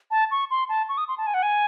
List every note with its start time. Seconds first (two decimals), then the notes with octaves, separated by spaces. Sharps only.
0.11 A5
0.31 C#6
0.51 C6
0.69 A5
0.89 C#6
0.98 D#6
1.08 C6
1.18 A5
1.27 G#5
1.34 F#5
1.43 G#5